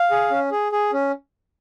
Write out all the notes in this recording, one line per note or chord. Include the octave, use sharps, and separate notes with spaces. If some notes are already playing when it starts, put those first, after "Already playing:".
Already playing: F5
G#4
C#4
G#4
G#4
C#4